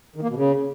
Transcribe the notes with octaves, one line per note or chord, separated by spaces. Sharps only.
D#3
A#3
B2
C#3